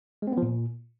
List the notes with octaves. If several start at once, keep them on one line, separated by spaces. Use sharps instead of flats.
G#3
C4
B3
F3
A#2